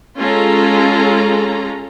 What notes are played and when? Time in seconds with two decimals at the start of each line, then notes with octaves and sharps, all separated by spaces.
0.19 G#3 C#4 F4 A4 A#5